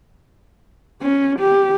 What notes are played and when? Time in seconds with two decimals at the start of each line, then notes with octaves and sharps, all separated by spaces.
1.02 C#4
1.39 G4